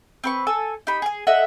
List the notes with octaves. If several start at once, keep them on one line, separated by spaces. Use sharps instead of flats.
C4 B4 C#6
A4 G#5 E6
D#4 G4 B5
G#4 G#5
A4 D#5 E5 F#5